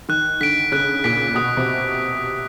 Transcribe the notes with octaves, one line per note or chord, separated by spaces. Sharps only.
D#3 F#6
D3 B6 D7
C#3 F#6
A#2 B6 D7
B2 D#6
C3